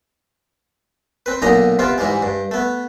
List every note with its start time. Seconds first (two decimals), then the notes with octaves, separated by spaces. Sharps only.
1.26 C4 B4
1.42 B1 A#2 D3 D#4 D#5 A#5
1.79 C3 B3 C4 F4
1.98 G#2 E3 G3 G#3
2.22 G2
2.51 A3 B3